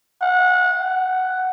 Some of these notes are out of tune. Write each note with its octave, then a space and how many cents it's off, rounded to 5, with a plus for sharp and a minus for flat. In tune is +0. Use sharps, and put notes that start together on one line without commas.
F#5 -25
F#5 +5